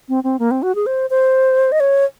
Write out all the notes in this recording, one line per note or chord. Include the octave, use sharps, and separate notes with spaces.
C4
C4
A#3
C4
F#4
G#4
C5
C5
D#5
C#5